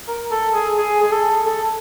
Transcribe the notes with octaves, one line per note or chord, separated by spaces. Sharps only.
A#4
A4
G#4
G#4
G#4
A4
A4